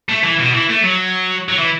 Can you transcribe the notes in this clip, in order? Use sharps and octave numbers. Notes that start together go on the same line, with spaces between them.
A3
E3
B2
E3
A3
F#3
F#3
E3